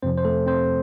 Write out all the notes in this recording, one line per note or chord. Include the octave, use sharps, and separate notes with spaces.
F2 C3 F3 C4 C5
C5
A3 A4
C4 C5